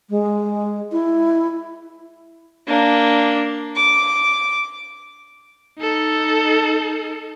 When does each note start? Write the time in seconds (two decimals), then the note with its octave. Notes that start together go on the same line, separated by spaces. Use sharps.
0.10 G#3
0.92 E4
2.67 A#3 D4
3.76 D6
5.79 D#4 A4